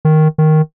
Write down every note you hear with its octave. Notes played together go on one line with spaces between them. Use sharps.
D#3
D#3